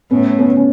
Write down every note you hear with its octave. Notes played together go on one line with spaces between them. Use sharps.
A2 B3 C#4
B3 C#4
C#4